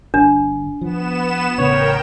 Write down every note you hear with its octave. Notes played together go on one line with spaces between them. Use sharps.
G1 D4
F3 B3 E7
A1 C#3 A#4 C#5 G5